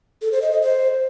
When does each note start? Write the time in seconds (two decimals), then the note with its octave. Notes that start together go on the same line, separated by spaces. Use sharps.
0.22 A4
0.32 C5
0.42 D#5
0.52 D#5
0.62 C5